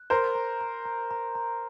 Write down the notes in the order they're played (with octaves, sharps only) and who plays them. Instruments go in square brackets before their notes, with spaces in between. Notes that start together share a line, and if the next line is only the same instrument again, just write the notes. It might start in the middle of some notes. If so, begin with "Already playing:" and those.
Already playing: [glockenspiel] F#6
[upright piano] A#4 C5 [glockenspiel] A#5
[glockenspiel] A#5
A#5
A#5
A#5
A#5